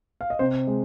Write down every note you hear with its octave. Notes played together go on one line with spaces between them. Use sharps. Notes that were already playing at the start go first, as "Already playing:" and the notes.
F5
D#5
C3 C5
G#3